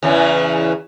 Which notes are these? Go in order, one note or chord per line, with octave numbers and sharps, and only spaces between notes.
E2 C#3 E3